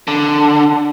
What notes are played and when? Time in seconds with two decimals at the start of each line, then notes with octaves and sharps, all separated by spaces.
0.08 D3